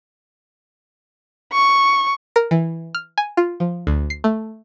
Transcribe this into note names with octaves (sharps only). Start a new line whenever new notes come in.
C#6
A#4
E3
F6
G#5
F4
F3
D2
C7
A3